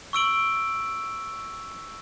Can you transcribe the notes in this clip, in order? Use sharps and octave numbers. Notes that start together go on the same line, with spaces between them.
C#6 E6 D7 F#7